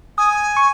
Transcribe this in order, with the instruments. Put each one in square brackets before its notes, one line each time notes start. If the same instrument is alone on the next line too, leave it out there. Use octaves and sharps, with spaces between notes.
[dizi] G#5 [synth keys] D#6
[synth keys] C#6